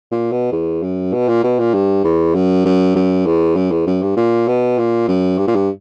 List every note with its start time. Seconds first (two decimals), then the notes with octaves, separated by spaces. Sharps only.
0.12 A#2
0.32 B2
0.52 E2
0.83 F#2
1.13 B2
1.28 A#2
1.43 B2
1.59 A#2
1.74 G2
2.04 E2
2.35 F#2
2.65 F#2
2.96 F#2
3.26 E2
3.56 F#2
3.71 E2
3.86 F#2
4.02 G2
4.17 A#2
4.48 B2
4.78 A#2
5.08 F#2
5.38 G2
5.47 A#2
5.55 G2